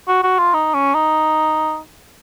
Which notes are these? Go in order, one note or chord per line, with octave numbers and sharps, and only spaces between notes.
F#4
F#4
F4
D#4
C#4
D#4